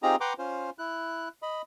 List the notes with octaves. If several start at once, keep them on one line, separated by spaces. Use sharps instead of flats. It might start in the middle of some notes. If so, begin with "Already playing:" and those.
C4 D#4 F4 G4 G#4 A#5
B4 F#5 G5 A#5 C6 D6
C#4 F4 C5
E4 F#6
D#5 B5